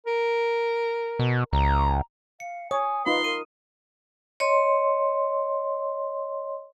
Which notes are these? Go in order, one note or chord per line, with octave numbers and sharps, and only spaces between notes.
A#4
B2
C#2 A#5
F5 C#7
C#5 G#5 D#6
D#4 F4 B4 B5 C6
A#4 D#7
C#5 D#5 C6